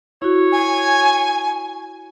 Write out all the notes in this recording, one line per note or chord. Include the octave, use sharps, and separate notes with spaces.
E4 F#4 C#5
G#5